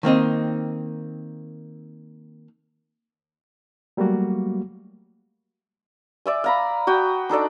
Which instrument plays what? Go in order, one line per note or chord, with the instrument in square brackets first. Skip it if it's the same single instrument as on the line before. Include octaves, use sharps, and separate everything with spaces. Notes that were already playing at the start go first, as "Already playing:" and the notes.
[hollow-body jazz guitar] D#3 A#3 C4 D#4
[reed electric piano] F#3 G3 A3 A#3 F#4
[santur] D5 E5 G#5
F5 A#5 B5
F#4 G5 D#6
D4 D#4 A4 D5